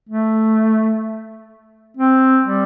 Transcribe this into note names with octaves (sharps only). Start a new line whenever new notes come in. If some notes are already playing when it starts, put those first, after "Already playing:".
A3
C4
G3